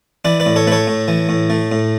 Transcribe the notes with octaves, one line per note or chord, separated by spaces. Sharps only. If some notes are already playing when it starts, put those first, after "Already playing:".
E3 B4 D5
B4 D5
A2
A4 C#5
A3 A4 B4 C#5
A2
E3
A2
A3
A2